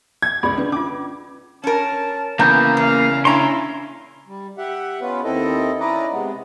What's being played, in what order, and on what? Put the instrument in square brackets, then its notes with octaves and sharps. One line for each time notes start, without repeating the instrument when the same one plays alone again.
[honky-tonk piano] G#6
[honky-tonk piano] C#2 [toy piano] G#4 D5 B5
[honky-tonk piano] D3 [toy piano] D4 B4
[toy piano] C#4 F4 [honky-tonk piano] D6
[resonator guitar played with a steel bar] C#4 A#4 [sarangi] A5
[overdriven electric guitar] C#3 [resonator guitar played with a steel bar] E3 [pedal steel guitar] A#3 A#5 G6 [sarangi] B3
[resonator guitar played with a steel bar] E2 [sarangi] F5
[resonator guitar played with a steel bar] C#4 D4 [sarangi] E4 [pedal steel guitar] A#5 C6
[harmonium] G3
G4 E5 F#5
B3 C#4 F4 B4
D#2 C4 E4 A4 D#5
C#4 E4 B4 D5 D#5 A#5
C3 G#3 B3